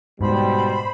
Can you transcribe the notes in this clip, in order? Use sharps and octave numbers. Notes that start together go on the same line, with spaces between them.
G#2 B2 G3 C5 B5